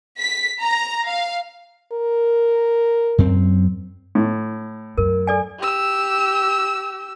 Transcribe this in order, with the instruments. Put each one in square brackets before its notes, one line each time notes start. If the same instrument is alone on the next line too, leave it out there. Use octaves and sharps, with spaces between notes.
[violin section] B6
A#5
F5
[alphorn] A#4
[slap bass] F#2 C4
[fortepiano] A2
[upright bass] F#2 [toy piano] A#4
[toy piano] A4 D5 G#5
[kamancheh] G4 E6